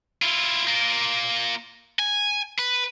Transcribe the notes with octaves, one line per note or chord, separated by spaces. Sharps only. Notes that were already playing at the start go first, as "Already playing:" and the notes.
E4 F4
A#3 F4
G#5
B4